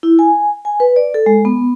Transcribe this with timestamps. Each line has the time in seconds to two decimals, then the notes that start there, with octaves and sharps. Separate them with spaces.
0.03 E4
0.19 G#5
0.65 G#5
0.80 B4
0.96 D5
1.14 A4
1.26 G#3
1.45 B3